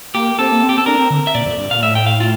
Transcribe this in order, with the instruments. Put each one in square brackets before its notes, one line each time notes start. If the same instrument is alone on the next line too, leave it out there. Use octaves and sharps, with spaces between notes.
[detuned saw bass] A#3 [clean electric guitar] G4
[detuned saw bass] C4 [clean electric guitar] A4
[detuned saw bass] A#3
C4
[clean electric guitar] G4
A4
[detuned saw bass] D4 [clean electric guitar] A#4
[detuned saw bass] C4
D3
[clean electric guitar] E5
[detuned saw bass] A#2 [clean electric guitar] D5
[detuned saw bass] F2
G2
[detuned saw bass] A#2 [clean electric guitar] F5
[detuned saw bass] A2 [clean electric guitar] E5
[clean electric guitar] G5
F5
F4